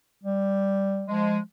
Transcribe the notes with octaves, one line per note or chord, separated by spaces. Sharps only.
G3
F3 G#3